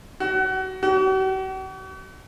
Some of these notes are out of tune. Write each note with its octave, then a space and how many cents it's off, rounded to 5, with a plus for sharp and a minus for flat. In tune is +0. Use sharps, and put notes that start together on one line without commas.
F#4 +30
F#4 +45